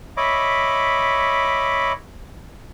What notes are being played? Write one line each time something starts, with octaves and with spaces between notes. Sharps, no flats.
C#5 D#5 E5 B5 D6